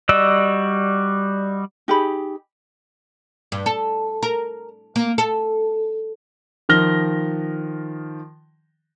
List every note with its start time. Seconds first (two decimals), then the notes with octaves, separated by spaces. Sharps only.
0.09 G3 F#4 D5 D#5 E6
1.88 D#4 G4 G#4 B5
3.52 G2
3.66 A4
4.23 A#4
4.96 A#3
5.18 A4
6.69 D#3 F3 F6 A#6 G7